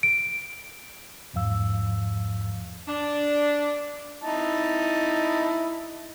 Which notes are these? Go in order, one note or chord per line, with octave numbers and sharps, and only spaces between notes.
D7
E2 G#2 F3 F5 E6
D4
D#4 E4 A5